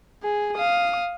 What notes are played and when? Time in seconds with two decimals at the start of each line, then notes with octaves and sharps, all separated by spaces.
0.23 G#4
0.56 F5 D#6